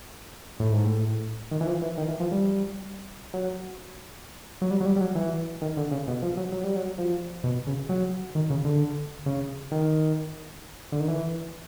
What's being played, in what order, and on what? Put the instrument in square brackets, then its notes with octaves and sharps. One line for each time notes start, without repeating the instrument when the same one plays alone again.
[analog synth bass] A2
G#2
A2
D#3
E3
F3
E3
D#3
E3
F3
G3
F#3
F#3
G3
F#3
G3
G3
F#3
E3
D#3
D3
C#3
B2
F3
F#3
F#3
G3
F#3
F3
B2
C#3
F#3
D#3
C#3
D3
C#3
D#3
D3
D#3
E3